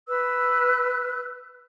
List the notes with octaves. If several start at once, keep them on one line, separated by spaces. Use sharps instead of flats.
B4 E6 F#6